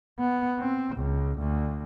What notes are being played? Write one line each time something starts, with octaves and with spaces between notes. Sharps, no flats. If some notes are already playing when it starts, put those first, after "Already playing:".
B3
C4
C#2
D2